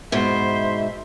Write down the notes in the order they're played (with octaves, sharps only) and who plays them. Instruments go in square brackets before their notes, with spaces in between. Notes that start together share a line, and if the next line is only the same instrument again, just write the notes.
[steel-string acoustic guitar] G#2 B2 [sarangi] C5 [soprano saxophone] E5